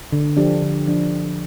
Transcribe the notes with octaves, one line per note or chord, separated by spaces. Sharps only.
D3
F3 D4 G4
D3
F3 D4